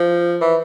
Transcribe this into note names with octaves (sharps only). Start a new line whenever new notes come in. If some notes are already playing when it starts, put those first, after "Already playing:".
Already playing: F3
E3